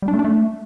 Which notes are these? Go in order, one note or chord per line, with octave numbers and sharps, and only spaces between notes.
G3
D4
A3
D4
A3